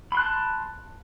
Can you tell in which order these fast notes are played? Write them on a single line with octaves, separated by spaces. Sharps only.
B5 C6 F#6 A5